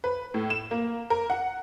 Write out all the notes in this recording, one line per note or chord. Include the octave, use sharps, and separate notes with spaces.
B4
A2
E7
A#3
A#4
F#5